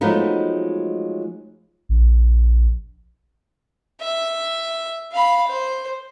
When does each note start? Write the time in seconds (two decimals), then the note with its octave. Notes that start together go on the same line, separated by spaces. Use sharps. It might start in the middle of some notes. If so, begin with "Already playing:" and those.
0.01 F3 F#3 G#3 A3 B3 D#4
1.89 A#1
4.00 E5
5.12 F5 B5
5.47 C5